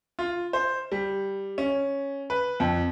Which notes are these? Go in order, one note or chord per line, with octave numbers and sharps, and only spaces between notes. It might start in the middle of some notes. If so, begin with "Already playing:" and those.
F4
C5
G3
C#4
B4
F2